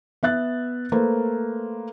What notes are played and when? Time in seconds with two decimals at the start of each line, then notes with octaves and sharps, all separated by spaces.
0.23 B3 E5 F#6 A6
0.92 A3 A#3 B4 C5